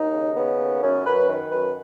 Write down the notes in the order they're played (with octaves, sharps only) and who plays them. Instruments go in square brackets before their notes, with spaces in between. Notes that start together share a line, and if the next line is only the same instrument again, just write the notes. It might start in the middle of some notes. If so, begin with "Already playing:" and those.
Already playing: [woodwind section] D#2 D#4
C#3
C#3 B3
D#2
F#2 C#4
F#2 B4
D#3
F#2 B4